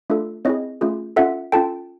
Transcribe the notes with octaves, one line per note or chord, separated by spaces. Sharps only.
A3 D4 F4 A4
C4 E4 G#4 C#5 D#5
A3 C#4 F4 G#4
C#4 F4 A4 E5 F#5
C#4 F4 A4 G5 A5